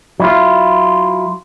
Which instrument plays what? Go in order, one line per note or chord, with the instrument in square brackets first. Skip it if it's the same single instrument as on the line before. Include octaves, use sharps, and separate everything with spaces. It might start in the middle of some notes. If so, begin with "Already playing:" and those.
[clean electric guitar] F#3 E4 F4